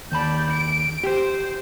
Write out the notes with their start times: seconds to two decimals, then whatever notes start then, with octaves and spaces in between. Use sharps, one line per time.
0.12 D#2 D5 A5 B5 G6
0.50 D7
1.04 G4 C5